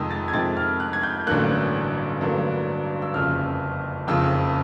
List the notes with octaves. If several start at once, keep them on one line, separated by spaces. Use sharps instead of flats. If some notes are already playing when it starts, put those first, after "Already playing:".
Already playing: F2 C3 D#3 G#3 D#6 E6
A6
G#6
F2 C3 D#3 G#3 C4 A6
F6
F#6
G#6
G6
A1 G2 D3 F#3 A#3 F#6
A1 G2 D3 F#3 A#3
E6
F#1 F2 C#3 F6
F#1 F2 C#3 E6